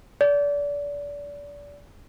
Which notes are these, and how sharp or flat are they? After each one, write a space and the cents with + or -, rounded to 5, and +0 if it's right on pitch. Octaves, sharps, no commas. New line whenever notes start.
D5 -30